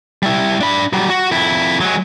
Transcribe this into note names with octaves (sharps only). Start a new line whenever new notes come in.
G3 E4
D4 B5
F#3 G3
F#4
F2 E4
F#3 G#3